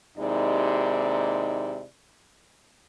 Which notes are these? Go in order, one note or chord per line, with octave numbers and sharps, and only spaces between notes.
D#2 C3 G#3 D#4 E4 D5